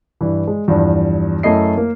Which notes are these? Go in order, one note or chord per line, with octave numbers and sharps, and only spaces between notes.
G2 E3
G#3
E2 G2 F3
F#2 A3 E4 D#5 C7
A#3